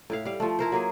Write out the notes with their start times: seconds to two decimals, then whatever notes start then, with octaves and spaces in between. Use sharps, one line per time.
0.10 A2 E4 F5
0.25 G3 F5
0.40 F3 A3
0.59 E4 A#4 C5
0.72 F#3 A#3 G#4